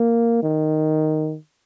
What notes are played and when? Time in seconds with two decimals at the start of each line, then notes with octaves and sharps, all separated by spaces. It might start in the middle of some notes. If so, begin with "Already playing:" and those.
Already playing: A#3
0.43 D#3